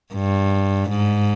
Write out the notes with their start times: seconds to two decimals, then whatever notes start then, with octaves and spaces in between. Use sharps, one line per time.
0.14 G2
0.90 G#2